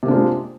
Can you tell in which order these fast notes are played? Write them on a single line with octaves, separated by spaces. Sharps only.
C3 A#3 D4 F4 G#3